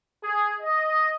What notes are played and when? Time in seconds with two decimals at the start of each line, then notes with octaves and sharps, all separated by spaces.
0.22 G#4
0.60 D#5